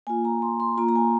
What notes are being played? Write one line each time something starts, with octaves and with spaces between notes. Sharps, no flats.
A#3 F4 G#5
A#5
C6
C6
A#3 F4 A#5
A#5
G#5